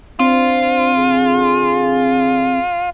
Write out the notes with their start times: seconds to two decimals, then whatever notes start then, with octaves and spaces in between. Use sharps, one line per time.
0.19 C4 D4 F4 C5
0.95 D3 G#4